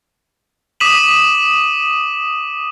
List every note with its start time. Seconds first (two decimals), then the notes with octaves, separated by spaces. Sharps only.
0.80 D6 D#6 B6 D#7 E7 F#7